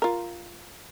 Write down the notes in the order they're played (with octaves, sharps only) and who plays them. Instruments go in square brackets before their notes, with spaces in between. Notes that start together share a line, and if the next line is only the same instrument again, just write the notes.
[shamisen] F4 A#4